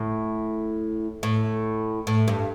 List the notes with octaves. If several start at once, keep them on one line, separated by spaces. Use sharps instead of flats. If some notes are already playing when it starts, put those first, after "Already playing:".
Already playing: A2
A2
A2
G2